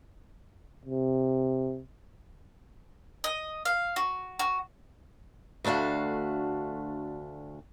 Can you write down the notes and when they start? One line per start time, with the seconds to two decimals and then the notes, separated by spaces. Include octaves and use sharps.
0.86 C3
3.24 D#5
3.65 F5
3.96 F#4
4.39 F#4
5.64 D2 A3 D4 F#4 F5